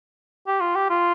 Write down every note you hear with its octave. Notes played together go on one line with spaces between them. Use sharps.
G4
F4
G4
F4